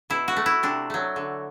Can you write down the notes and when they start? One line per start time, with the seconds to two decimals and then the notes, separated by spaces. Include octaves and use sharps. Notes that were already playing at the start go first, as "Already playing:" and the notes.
0.10 B2 E4
0.28 F#4
0.37 A3
0.46 E4
0.63 C3 D4
0.90 F#3 A3
1.16 D3